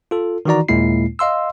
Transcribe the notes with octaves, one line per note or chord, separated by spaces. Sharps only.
F4 A4
D#3 E3 D#4 F#4 D5 A#5
D#2 A#2 G#3 A#3 E4 C7
D#5 F5 C6 E6